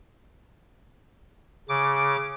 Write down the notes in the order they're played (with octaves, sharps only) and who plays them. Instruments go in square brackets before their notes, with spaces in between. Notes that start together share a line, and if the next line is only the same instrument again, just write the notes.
[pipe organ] C#3 D6